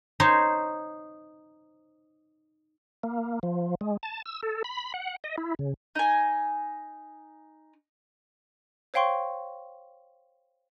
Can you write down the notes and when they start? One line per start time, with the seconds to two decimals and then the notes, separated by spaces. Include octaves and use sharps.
0.20 D#4 C5 C#5
3.03 A#3
3.43 F3
3.81 G#3
4.03 A5
4.26 E6
4.43 A4
4.64 B5
4.94 F#5
5.24 D#5
5.38 E4
5.59 C#3
5.95 D#4 G#5
8.94 C5 C#5 F5 G5 C6 C#6